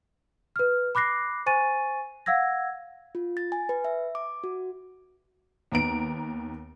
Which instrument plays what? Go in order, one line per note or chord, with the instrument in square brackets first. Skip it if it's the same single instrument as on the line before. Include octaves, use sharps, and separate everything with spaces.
[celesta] B4 F6
B5 D6 F#6 A#6 C7
C5 G#5 C#6 A6 D#7
F5 F#5 E6 G#6 A#6
[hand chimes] F4
A6
G#5
B4
E5
D6
F#4
[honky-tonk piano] D#2 B3 A#5 D7